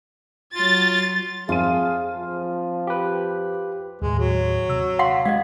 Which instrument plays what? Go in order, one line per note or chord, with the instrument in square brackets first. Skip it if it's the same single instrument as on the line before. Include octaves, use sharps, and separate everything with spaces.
[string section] F#3 A6 [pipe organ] F4
[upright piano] F2 D#7 [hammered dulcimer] F4 [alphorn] G#4
[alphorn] F3
[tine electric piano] G4 B4
[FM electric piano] D#2 A2 [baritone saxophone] G#3
[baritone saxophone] F#3
[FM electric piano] C3 E6
[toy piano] F5 F#5 C6
[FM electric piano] G#3 G#6 [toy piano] D#5 F5